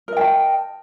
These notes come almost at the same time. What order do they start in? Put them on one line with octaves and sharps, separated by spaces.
A#4 D#5 G5 A5